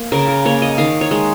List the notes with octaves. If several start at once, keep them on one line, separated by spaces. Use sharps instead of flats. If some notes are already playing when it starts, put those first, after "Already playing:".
Already playing: A#3
C#3 A#4
A#4
A#3 C#5
D#5
D#3 F5
C#5
G#3